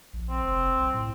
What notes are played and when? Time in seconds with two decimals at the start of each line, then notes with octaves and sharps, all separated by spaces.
0.13 A#1
0.30 C4
0.43 F1
0.78 B1
0.94 A2